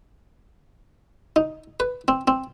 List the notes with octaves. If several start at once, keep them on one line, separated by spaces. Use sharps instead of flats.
D#4
B4
C4
C4